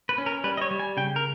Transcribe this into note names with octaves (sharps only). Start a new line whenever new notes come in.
B4
C#4
A#4
G3 B4
D#5
C#5
G3
G#5
C#3 G5
A#4